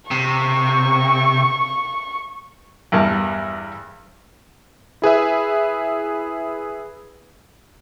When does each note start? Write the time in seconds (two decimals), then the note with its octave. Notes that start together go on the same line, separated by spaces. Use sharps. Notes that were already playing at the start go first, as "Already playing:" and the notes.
0.11 C3 C#6
2.92 E2 G2 A#4 A5
5.02 E4 G#4 B4 E5